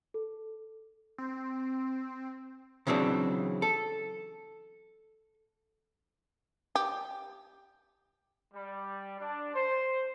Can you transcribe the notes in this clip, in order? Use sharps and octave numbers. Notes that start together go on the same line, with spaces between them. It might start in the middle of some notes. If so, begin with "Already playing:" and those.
A4
C4
C#3 E3 F#3 C4 D4
A4
G4
G3
D4
C5